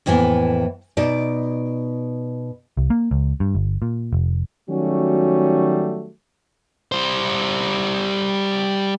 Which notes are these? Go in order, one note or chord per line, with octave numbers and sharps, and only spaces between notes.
F2 A2 E3 A#3 B3
B2 D#4 D5
C2
A#3
C#2
G2
G1
A#2
F1
D#3 F#3 G3 A3 C#4 F#4
G3 C5